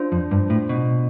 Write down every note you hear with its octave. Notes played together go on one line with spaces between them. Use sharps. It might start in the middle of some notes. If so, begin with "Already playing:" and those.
Already playing: D4 F4 C5
F2
G2
A2
B2